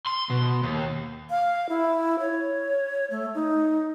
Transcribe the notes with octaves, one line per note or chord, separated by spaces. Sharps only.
C6
B2
D#2
F5
E4
C#5
A3
D#4